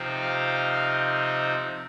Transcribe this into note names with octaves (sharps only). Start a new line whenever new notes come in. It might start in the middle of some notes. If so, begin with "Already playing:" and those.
Already playing: C3 F3 C4 D#4
F5